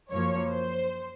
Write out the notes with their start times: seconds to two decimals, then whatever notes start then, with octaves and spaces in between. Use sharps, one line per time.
0.11 F#2 F3 A#3 C#5
0.49 C5